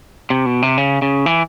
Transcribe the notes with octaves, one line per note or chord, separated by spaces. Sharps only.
C3
B2
C3
C#3
C#3
E3